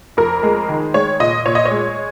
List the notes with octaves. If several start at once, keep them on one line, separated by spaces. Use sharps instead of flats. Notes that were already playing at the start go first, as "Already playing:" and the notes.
F2 A#4
G#3
D#3
G#3 C#5
A#2 D#5
A#2 C#5
D#5
C#5
G#3